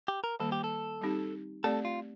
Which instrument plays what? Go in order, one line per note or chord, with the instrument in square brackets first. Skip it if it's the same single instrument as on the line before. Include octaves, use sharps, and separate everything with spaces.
[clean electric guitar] G4
A#4
[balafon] D#3 G3 A#3 [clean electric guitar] A4
[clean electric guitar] G4
A4
[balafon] G3 C4 D#4 G4
[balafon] A3 C4 G4 D5 [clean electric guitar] A4
[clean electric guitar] F4